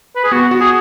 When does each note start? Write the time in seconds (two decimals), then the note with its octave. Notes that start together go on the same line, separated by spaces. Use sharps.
0.16 B4
0.24 G#4
0.32 B3 F#4
0.51 F#4
0.61 G#4